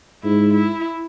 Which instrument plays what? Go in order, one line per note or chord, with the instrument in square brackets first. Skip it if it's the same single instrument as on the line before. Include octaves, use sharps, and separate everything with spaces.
[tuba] G#2 [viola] E4
[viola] E4